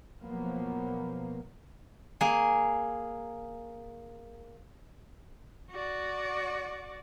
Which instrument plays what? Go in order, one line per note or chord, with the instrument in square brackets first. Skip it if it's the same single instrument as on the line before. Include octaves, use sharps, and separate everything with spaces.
[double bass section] B2 F3 F#3 A#3 B3
[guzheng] A#3 G#4
[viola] F#4 D5